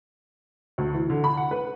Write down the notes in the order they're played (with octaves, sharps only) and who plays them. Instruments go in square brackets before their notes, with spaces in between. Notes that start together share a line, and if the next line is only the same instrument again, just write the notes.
[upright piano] D2
E3
D3
B5
F#5
B4